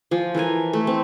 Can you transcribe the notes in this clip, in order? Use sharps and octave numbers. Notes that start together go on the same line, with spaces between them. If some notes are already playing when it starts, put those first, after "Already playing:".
F3 G#5
E3 A4 A#4 G#5
A3
C4